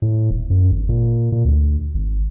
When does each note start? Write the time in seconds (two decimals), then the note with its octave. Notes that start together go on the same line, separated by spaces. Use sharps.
0.02 A2
0.31 D#1
0.50 F#2
0.71 G#1
0.89 A#2
1.32 A#2
1.45 D2
1.94 G#1